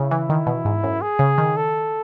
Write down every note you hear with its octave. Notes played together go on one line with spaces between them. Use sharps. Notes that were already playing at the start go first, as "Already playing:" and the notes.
Already playing: C#3 E4
E3
D#3
B2
G#2
F#2
G#4
C#3
D#3
A4